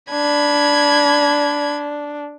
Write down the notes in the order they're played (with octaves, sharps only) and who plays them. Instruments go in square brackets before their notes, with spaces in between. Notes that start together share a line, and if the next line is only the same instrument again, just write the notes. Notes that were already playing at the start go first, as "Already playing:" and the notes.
[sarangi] D4 [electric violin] B5 G#6